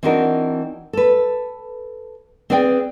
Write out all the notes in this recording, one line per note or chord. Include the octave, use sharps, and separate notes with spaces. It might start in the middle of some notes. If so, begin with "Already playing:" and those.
E3 C4 D4 D#4 F#4 A#4
A4 B4
C4 G#4 B4 D5 G5